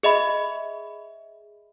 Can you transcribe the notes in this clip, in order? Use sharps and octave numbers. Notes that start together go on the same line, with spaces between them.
G#4 D#5 E5 B5